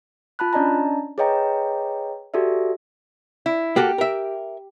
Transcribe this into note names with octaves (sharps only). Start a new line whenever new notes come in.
F4 A5 B5 F#6
C#4 D4 D5 D#5 A5 A#5
G#4 B4 C#5 D#5 G5 A#5
F#4 G4 A4 D5 E5
E4
A#3 F#4 G4 A4
A#4 E5